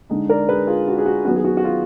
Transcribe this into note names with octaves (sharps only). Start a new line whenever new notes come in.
D3 G#3 D#4
A#4 D5
G#4 B4
F4 G#4
F#4
G#4
F#4
D#3 F#3 B3 F#4
G#4
F#4
F#4
F4 G#4